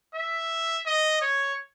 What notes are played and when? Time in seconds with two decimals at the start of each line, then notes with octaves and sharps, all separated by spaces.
0.15 E5
0.86 D#5
1.21 C#5